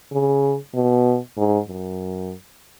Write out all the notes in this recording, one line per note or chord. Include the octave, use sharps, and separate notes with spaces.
C#3
B2
G#2
F#2